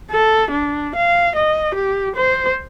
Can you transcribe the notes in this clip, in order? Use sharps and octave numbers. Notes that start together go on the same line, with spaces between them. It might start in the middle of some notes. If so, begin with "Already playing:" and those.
A4
D4
F5
D#5
G4
C5